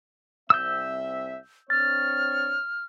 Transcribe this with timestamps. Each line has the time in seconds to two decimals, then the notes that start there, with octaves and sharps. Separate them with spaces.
0.50 C2 C4 E5 E6 G6
1.70 C4 D4 C#5 F6 A6